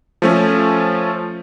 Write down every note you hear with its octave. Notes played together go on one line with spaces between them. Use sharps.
F3 A3 C#4